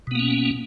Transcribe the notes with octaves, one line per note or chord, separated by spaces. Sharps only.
B2 A#3 B3 C#4